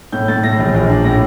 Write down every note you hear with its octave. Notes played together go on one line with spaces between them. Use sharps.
A2 G6
A2 A6
A2 A#6
A#1
A#1
D4
A2 A#6